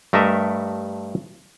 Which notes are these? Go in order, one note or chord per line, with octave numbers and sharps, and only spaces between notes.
G2 A3 A#4 D#5 E5